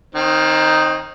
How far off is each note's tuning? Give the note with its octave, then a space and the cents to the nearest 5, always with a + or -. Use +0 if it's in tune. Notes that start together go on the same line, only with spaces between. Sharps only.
D#3 +0 C4 +30 D#4 +0